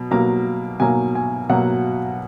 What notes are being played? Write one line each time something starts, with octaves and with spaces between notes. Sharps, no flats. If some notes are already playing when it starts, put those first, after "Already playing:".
Already playing: B2 F#3
B2 F#3 A#3 A#5
B2 F#3 A#3 G#5
G#5
B2 F#3 A#3 F#5